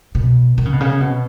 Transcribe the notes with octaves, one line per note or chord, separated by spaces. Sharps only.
B2
D#3
C#3
B2
C#3
B2